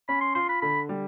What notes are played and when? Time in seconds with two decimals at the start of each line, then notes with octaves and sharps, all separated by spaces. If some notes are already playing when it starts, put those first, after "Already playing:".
0.09 C#4 B5
0.21 C6
0.35 F4 C6
0.49 B5
0.62 D3 B5
0.89 G3